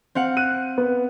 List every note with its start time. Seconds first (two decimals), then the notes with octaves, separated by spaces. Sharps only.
0.15 C4 F5 F#5
0.37 F#6 D#7
0.78 B3